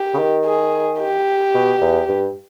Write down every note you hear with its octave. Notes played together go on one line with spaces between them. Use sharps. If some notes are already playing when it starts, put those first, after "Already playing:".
Already playing: G4
C#3
D#3
G#4
G4
B2
E2
G2